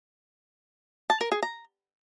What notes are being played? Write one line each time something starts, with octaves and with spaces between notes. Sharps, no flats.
A5
A#4
G#4
A#5